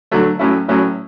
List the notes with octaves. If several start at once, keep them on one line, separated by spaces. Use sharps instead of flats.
D3 F#3 A3
A2 F#3 C#4 E4
A2 F#3 C#4 E4